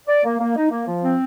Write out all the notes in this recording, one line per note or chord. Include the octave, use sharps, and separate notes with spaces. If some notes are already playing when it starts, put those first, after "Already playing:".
D5
A#3
A#3
D#4
A#3
F3
C4